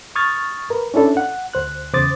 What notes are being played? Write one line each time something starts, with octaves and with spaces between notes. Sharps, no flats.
C#6 D#6 F6 G#6 A6
A#4 B4
C#4 D4 E4 A4 D5
F#5
D2 C5 F#6
E2 C#3 C5 D6 D#6 A6